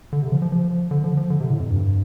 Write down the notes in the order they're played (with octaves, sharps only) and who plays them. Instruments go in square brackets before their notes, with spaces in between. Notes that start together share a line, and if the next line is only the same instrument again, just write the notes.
[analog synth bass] D3
C3
F3
F3
F3
D3
F3
F3
D3
C3
A2
F2
G2